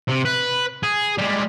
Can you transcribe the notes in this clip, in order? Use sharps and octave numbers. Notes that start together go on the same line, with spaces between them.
C3
B4
G#4
G3 G#3